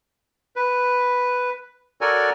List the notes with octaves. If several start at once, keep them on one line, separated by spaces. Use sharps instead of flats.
B4
F#4 A4 A#4 C#5 D5 G#5